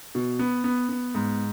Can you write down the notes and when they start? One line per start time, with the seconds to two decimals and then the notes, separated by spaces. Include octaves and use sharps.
0.15 B2
0.39 B3
0.64 B3
0.89 B3
1.15 G#2